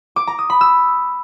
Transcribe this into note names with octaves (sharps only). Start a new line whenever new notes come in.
D6
A#5
D#6
B5
E6